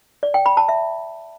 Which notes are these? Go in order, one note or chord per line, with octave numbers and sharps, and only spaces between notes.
D5
G5
B5
A5
E5